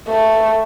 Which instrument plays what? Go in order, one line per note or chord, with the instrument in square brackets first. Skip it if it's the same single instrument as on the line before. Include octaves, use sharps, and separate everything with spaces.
[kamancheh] A3